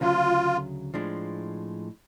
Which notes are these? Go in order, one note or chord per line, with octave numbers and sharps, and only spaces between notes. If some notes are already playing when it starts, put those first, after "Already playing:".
D2 C#3 F#3 F4
A2 F3 G#3 D4